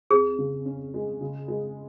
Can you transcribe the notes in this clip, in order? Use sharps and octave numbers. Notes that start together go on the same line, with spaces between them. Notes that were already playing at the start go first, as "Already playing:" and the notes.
F2 G#4
C#3
C#4
G#3
C#3
G#3